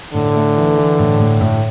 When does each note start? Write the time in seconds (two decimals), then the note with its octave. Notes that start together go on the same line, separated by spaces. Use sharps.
0.14 A2 D3
0.35 A3
0.57 E3
0.77 E3
0.99 A2
1.19 A2
1.41 A2